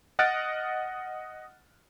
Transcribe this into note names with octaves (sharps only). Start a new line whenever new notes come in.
D#5 F#5 F6 F#6 A6 D7